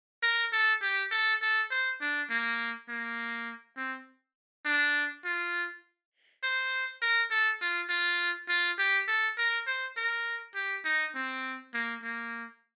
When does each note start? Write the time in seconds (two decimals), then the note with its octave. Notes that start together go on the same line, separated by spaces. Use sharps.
0.23 A#4
0.53 A4
0.83 G4
1.12 A4
1.42 A4
1.71 C5
2.01 D4
2.30 A#3
2.89 A#3
3.77 C4
4.66 D4
5.25 F4
6.44 C5
7.02 A#4
7.31 A4
7.62 F4
7.90 F4
8.49 F4
8.79 G4
9.08 A4
9.38 A#4
9.67 C5
9.97 A#4
10.55 G4
10.85 D#4
11.15 C4
11.74 A#3
12.03 A#3